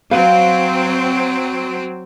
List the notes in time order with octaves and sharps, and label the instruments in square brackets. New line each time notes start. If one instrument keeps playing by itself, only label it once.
[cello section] F#3 C4 [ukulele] B4 F5